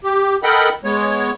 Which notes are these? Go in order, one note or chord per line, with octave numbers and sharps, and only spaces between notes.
G4
A4 A#4 D#5 F#5 G5 B5
G#3 B3 C#5